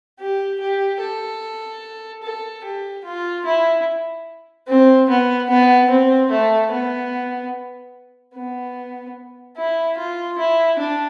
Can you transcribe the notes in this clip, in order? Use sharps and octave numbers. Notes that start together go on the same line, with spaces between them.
G4
G4
A4
A4
G4
F4
E4
C4
B3
B3
C4
A3
B3
B3
E4
F4
E4
D4